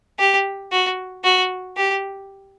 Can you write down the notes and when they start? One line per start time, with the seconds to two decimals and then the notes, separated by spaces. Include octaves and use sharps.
0.19 G4
0.72 F#4
1.24 F#4
1.77 G4